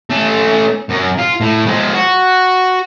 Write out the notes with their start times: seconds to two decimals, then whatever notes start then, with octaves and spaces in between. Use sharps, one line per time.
0.10 A3 C#4
0.90 F#2
1.19 F4
1.41 A2
1.66 F3 G#3
1.94 F#4